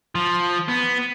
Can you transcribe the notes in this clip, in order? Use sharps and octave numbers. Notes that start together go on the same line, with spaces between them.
F3
B3